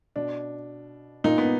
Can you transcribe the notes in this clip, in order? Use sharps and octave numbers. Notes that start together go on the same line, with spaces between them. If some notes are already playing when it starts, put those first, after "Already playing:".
B2 D4
A#2 D#4
B3